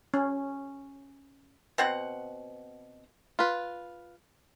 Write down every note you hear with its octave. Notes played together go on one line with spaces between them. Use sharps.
C#4
B2 C4 F#5
F4 B4